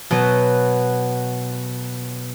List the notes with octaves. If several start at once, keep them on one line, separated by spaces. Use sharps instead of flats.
B2 F#3 B3